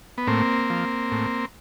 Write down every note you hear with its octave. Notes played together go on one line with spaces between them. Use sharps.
B3
A2 A#3 C4
F3
A2